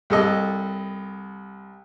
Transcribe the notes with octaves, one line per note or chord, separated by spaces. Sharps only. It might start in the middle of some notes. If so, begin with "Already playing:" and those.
C2 A4 D#5